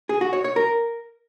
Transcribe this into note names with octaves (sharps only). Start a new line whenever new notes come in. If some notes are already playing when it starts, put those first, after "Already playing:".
G#4
F#4
C#5
C#5
A#4